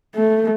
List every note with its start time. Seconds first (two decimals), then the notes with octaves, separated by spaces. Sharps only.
0.16 A3